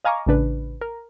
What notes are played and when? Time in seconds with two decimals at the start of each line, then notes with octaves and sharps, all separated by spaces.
0.04 D#5 F5 G#5 A#5 C#6 D6
0.26 A1 C#3 D4 B4
0.81 A#4